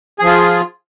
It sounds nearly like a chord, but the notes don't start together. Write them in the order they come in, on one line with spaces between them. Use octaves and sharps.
G#4 F3 F4